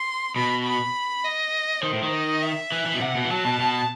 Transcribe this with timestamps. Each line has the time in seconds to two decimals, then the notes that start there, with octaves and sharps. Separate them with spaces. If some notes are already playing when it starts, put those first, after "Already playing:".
Already playing: C6
0.36 B2 B5
0.65 B5
1.24 D#5
1.83 D#3 C5
1.93 A2
2.03 D#3
2.12 D#5
2.42 E5
2.72 E3
2.86 E3
2.94 B2
3.01 C3 F#5
3.15 B2
3.25 E3
3.30 F#3 A5
3.45 B2
3.60 B2